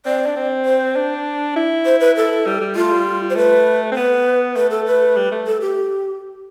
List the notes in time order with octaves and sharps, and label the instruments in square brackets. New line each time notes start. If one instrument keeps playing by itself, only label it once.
[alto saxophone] C4 [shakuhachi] D5
[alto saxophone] D4
C4
[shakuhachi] C5
[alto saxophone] D4
E4
[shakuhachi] C5
B4
A4
[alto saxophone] G3
G3
[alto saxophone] A3 [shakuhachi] F4
[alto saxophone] G3
[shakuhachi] C5
[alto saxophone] A3 [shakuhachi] B4
[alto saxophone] C4
[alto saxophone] B3 [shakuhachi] B4
[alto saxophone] A3 [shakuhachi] B4
[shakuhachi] A4
B4
[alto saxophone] G3
A3
[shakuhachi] A4
G4